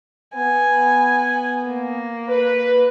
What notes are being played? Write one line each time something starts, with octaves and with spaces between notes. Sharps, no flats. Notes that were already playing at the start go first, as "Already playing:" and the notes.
B3 G#5
A#3
B4